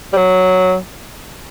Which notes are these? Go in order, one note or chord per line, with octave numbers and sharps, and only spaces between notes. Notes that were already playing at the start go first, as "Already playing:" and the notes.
G3
F#3